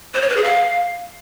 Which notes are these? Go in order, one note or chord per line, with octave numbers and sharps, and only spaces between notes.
C5
C#5
B4
G#4
F5